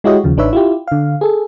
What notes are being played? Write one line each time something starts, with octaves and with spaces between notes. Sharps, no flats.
G#3 E4 F#4 G4 C#5 D#5
D#2 C#3 F3
A1 D4 D#4 B4 C#5 E5
E4 F4 G4
D3 F5
G#4 A4